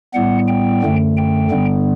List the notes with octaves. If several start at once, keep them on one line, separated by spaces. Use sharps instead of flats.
A2 G3 B3 F#5
G5
F#2 D3 A3
G5
G2 D3 G3 B3